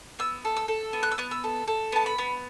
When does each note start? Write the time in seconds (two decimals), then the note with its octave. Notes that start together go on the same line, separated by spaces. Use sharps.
0.19 B3 E6
0.45 A4
0.57 E6
0.68 A4
0.93 B3
1.03 F#6
1.11 E6
1.18 B3 F#6
1.31 E6
1.44 A4
1.68 A4
1.92 B3 A5
2.06 B5
2.18 B3